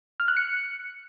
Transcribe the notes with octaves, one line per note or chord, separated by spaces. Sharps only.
F6
F#6
C#7